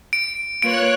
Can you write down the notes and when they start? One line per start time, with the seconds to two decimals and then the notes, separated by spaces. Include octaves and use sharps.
0.13 D7
0.62 A#3 F4 B4 C#5 F#6 D7